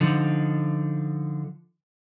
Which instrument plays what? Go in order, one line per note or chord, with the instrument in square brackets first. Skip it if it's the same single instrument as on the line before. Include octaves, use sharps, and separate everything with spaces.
[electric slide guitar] D3 F3 D#4